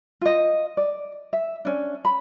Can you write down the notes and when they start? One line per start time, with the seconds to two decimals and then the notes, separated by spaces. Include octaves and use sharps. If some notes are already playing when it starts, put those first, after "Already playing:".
0.21 F4 D#5
0.77 D5
1.33 E5
1.65 C#4 D4
2.05 B5